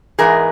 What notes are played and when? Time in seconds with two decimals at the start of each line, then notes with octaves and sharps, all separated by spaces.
0.19 G#2 E3 G#3 B3 G#4 A#4